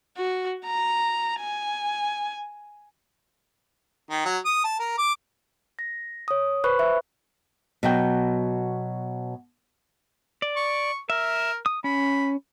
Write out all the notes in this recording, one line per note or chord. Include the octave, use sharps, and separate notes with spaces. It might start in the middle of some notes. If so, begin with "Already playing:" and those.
F#4
A#5
G#5
D#3
F#3
D#6
A5
A#4
D6
A#6
C#5 D#6
B4 C5 B5 C#6 F#6
E5
B2 F#3 G5
D5
C#6
A#4 E5
D#6
C#4 B5